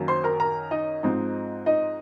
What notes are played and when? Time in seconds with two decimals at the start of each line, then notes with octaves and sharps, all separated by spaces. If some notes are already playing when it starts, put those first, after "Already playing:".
Already playing: F#2 D#3 F#3 A#3
0.08 C5 C6
0.24 A#4 A#5
0.40 A#4 A#5
0.71 D#4 D#5
1.03 G#2 F3 C4 D#4
1.66 D#4 D#5